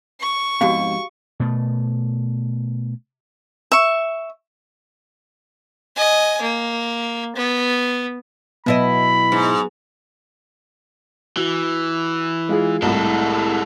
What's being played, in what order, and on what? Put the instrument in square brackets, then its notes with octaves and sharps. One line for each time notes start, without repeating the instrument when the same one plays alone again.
[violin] C#6
[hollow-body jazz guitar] F2 G#2 B2 [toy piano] F#4 G4 F5
[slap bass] B2 A3
[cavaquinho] E5 C#6
[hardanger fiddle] D#5 G#5
A#3
B3
[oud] B2 E4 D#5 [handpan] F#3 B3 [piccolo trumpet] B5
[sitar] G#2
[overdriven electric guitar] E3 [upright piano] F#4
[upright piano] G#3 F4 G#4
[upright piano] C2 A2 [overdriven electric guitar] G#3 A4